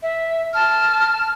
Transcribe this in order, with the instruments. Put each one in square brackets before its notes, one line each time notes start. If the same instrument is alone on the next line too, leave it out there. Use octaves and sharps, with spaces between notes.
[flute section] E5
A5 F6